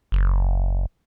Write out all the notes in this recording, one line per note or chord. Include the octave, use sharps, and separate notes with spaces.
F#1